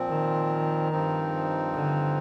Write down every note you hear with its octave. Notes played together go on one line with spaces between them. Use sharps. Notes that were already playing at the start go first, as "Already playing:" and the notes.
Already playing: A#2 F3 C4
D#3
G2 F3 C4 D#4
D3